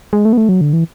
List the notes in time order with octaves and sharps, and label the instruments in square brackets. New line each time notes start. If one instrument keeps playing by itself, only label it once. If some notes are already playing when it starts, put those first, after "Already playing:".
[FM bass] G#3
A3
B3
A3
F#3
D3
E3